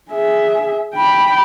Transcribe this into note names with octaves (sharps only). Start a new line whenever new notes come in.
G#4 E5
G5 B5